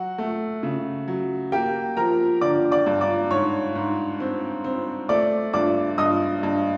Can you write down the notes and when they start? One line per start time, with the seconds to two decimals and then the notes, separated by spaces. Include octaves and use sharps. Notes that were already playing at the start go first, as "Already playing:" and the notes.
Already playing: F#3 F#4 F#5
0.18 A3
0.63 C#3
1.08 F#3
1.52 A#3 G4 G5
1.97 F3 A#4 A#5
2.41 D3 D5 D6
2.71 D5 D6
2.86 G2
3.01 D5 D6
3.30 G#2 C#5 C#6
3.75 G#2
4.20 C4
4.64 C4
5.09 A3 D5 D6
5.53 G2 D5 D6
5.98 G2 D#5 D#6
6.43 G2